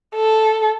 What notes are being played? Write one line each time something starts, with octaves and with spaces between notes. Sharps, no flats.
A4